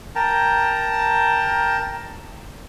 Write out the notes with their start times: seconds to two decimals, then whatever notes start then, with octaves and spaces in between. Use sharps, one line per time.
0.15 A#4 G5 A5 A#5